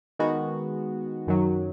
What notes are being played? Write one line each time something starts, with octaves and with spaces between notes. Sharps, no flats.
D#3 G#3 B3 F#4
F#2 D#3 F#3